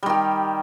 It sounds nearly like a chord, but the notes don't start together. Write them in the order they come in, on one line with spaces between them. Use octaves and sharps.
G3 D#3 G4